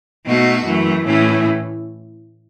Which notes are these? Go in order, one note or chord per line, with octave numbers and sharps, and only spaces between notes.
B2 A3 D#4 F#4
F#2 E3 A3
A2 E3 A3 C#4 E4